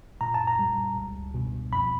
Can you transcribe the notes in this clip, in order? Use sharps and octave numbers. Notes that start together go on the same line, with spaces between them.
A#2 A#5
A5
A#5
G3
C#2
B2
F2 B5